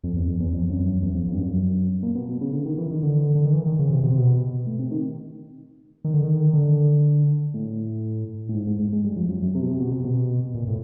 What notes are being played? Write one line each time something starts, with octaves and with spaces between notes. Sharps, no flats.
F2
E2
F2
E2
F2
F#2
F#2
E2
F2
F2
G2
F#2
F#2
A#2
B2
B2
C#3
D3
D#3
E3
D#3
D3
D3
D#3
E3
D#3
C#3
C3
B2
C3
B2
A2
C3
D#3
D#3
D3
D#3
D3
A2
A2
G#2
G#2
G#2
G#2
G2
F2
F#2
F#2
C3
B2
C3
B2
C3
B2
A#2
A2